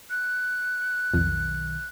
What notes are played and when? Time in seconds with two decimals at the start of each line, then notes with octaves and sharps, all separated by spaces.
0.10 F#6
1.14 B1 F2 D#3